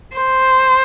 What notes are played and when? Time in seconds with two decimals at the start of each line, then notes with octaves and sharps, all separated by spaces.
0.17 C5